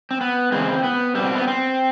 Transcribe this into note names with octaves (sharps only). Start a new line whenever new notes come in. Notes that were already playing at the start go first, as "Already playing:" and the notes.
C4
B3
C#3 E3 G#3 C4
B3
B2 G3 C4
B3
C4